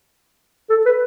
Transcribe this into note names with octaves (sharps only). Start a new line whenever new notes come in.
A4
B4